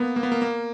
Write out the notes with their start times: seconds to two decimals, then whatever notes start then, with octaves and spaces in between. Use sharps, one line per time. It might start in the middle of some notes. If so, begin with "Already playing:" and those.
Already playing: A#3 B3
0.16 A#3
0.23 B3
0.32 A#3
0.42 A#3